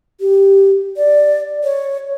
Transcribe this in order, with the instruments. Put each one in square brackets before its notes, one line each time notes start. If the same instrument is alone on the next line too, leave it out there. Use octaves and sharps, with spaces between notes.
[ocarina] G4
D5
C#5